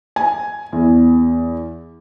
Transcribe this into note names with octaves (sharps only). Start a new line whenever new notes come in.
G#5
E2